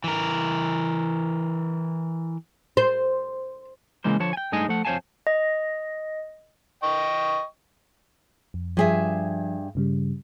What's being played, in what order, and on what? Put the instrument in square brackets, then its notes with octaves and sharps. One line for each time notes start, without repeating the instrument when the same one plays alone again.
[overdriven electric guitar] E3 A#4
[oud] C5
[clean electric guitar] C#3 E3 G#3 A#3 C5
D3 F3 C#5 A5
G5 G#5
G2 A3 D#4 G#4 D#5 G#5
F3 A3 F#5
F2 C5 C#5 F5 G#5 A5
[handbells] D#5
[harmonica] D#5 G5 C#6
[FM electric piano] F2
[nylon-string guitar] G2 G#4 E5 [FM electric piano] F3
[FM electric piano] G2 C#3 G3